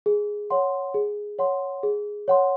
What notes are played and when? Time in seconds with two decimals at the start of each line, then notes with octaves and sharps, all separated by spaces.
0.06 G#4
0.50 C#5 F#5 C6
0.94 G#4
1.39 C#5 F#5 C6
1.83 G#4
2.28 C#5 F#5 C6